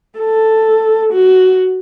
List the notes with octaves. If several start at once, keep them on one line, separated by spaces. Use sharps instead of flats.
A4
F#4